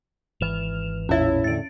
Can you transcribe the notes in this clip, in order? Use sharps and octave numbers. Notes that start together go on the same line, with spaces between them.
G#1 E3 F6 E7 F7
A1 E2 A#2 C#4 E4 C#5
A2 D3 A6 D7